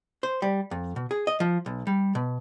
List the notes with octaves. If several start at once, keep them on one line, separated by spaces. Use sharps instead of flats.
C5
G3
F2
B2
G#4
D#5
F3
B1
G3
B2